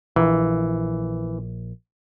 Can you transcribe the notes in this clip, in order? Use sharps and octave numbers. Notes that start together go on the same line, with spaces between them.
A#1 E3